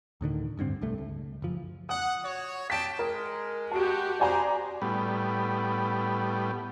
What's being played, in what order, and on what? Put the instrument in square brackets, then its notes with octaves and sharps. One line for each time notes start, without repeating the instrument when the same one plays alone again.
[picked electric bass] D2 A2 D3 D#3
D1 G2 D3 C4
B1 G2 A3
C#2
F#1 F3
[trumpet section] F#5 [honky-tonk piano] D#6
[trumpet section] F#4 C#5
[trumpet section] G4 G5 A5 [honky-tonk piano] B6 D7
[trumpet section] G#3 [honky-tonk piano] A#4
[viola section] F#4 G4 [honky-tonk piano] A5 D7
[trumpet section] G#4 C5 [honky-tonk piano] D5 G#5 A#5
[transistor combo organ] A2 G3 B3